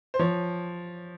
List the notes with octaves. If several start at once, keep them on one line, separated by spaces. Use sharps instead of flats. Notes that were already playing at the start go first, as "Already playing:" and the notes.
C5
F3 C#5